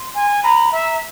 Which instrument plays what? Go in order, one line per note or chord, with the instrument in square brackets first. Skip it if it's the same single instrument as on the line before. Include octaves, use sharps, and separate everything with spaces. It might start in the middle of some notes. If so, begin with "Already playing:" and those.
Already playing: [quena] C6
[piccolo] G#5
[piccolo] A#5 [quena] B5
[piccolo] E5 [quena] A#5